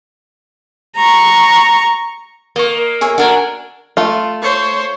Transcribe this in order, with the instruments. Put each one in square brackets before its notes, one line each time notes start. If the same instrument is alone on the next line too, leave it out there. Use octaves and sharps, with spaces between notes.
[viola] A#5 C#6
[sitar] A#3 [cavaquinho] D#5 C#6
[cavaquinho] G#4 C#5 E5
[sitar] D4 [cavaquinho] F#4 A#4 G#5
[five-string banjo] A3 F4
[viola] C5 C#5